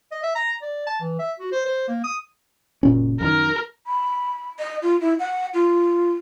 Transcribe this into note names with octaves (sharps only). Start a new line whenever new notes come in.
D#5
E5
A#5
D5
A5
E3
E5
F#4
C5
C5
A#3
D#6
F#1 A#2 C#4
F#2 D#3 A#4
B5
D#5
F4
E4
F#5
F4